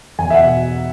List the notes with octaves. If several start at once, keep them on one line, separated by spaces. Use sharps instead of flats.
E2 G#5
E5
B2 F#5